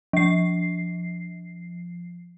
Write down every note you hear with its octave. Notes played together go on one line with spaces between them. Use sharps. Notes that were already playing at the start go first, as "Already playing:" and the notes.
F3 C7